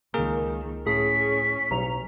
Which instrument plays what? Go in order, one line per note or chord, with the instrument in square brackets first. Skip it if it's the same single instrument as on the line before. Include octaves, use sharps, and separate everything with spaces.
[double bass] C#2 D#3 [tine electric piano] A#3 G#4 A#4
[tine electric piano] A2 [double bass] C#4 [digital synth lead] G#4 [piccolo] B6
[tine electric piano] B1 [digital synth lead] A#5